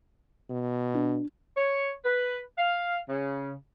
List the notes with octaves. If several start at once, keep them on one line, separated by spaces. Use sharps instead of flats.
B2
D4
C#5
B4
F5
C#3